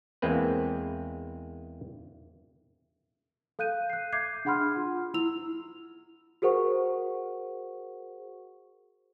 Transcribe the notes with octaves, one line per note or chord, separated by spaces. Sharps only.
E2 G#3 A#3 C4 B4
A4 F5 F#6 G6 D#7
F#6 C7
E5 D6 G6 G#6 C7
D4 G#4 F#5 B5 C6 F6
F4
E4 E6 F7
F#4 G#4 A#4 C5 F#5 C#6